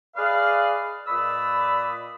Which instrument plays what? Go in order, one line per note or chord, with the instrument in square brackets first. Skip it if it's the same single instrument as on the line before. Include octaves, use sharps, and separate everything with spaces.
[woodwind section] G#4 B4 D5 D#5 F5
A#2 B4 D5 D#5 B5 E6